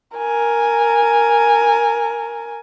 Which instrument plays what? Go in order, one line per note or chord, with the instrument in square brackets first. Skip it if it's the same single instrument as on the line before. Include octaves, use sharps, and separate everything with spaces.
[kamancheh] A#4 G#5